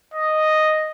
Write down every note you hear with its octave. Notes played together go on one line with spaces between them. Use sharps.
D#5